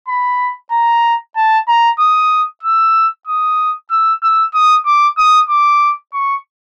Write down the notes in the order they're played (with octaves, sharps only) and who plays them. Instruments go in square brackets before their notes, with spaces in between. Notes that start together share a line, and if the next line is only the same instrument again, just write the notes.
[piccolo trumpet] B5
A#5
A5
A#5
D#6
E6
D#6
E6
E6
D#6
D6
D#6
D6
C#6